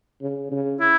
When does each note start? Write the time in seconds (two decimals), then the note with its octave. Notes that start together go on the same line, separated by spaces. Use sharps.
0.22 C#3
0.52 C#3
0.80 E4